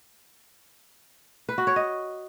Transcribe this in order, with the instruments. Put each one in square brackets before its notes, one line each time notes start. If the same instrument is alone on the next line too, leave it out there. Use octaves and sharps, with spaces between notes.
[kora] B4
F#4
C#5
D#5